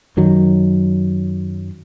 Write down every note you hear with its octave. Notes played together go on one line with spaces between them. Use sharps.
F#2 D#3 F#3